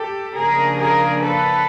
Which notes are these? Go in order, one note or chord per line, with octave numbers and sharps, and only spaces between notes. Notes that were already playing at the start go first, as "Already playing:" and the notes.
Already playing: G4 A4
C#3 F3 A#3 D4 G#4 A#4
G#4 A#4
A4 B4